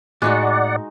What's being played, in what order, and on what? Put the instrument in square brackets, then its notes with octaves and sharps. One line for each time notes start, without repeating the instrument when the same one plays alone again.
[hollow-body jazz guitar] A2 [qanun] G#3 D#4 F#4 [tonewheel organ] D5 F#5